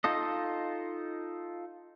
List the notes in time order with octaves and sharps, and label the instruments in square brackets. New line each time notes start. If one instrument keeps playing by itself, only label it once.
[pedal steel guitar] D#4 F4 A4 D#5